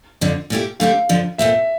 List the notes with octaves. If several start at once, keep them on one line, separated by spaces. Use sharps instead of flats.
F2 D3 F3
A#2 A3 E4 G4
D3 A3 C4 E4 G4 F5
F2 D3 F3
A#2 A3 C4 E5